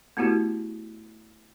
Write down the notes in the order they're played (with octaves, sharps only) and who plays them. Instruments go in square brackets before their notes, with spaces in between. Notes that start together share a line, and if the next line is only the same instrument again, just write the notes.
[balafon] A3 B3 E4 F#4 G4